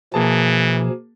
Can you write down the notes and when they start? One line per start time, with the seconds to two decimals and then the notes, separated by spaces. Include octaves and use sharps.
0.14 B2 E3 F3 A#3 G#4 A5